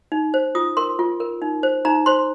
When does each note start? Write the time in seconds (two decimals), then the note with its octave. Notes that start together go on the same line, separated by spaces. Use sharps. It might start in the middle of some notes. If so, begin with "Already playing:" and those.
0.12 D#4
0.34 C5
0.55 F4 D#6
0.77 A#4 C6
0.99 F4
1.20 A#4
1.42 D#4
1.63 C5
1.85 D#4 A#5
2.06 C5 C6